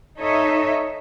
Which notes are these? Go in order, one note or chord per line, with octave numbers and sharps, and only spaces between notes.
D#4 A4 C#5 D#5 E5